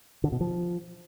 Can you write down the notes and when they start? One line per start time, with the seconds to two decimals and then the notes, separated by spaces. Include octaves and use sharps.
0.24 D3
0.32 B2
0.41 F3